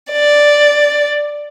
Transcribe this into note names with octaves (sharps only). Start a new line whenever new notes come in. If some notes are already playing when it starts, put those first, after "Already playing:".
D5